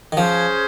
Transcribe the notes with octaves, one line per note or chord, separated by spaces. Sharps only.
D#3
F3 C#4 G#4 C5